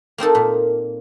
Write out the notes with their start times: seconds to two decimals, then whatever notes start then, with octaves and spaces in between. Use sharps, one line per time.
0.18 A#3 C4 D#4 A4
0.35 A#2